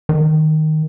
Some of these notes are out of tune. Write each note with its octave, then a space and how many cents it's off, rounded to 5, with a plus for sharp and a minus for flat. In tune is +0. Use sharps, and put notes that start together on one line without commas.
D#3 +0